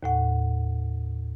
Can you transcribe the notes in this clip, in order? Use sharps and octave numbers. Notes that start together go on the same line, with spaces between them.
D#2 A2 F#5